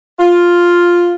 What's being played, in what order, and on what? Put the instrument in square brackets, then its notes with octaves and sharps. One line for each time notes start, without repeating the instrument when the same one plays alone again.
[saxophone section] F4